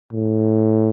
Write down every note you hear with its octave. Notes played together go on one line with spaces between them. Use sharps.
A2